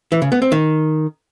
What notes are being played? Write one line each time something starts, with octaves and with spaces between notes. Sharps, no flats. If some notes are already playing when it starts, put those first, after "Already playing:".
E3
C#3
B3
C4
D#3